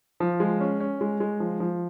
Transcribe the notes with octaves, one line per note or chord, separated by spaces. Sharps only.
F3
G#3
C#4
C#4
G#3
G#3
F3
F3